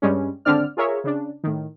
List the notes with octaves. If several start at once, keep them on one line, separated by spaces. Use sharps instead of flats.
G2 G3 G#3 C#4
G#1 D3 C4 D4 D5 F6
F4 G#4 A#4 C#5 E5
C#3 D4
A2 D#3